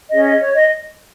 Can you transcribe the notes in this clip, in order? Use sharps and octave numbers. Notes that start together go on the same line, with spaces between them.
C#4 G#4 C#5 D#5
D#5
C#5
D#5